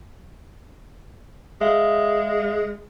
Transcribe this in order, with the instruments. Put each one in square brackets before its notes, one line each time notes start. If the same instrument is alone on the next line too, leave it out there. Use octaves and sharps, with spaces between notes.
[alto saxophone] G#3 [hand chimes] E5 F5